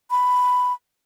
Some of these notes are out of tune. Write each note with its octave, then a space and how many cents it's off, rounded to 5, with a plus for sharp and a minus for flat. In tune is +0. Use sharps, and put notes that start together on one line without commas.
B5 +5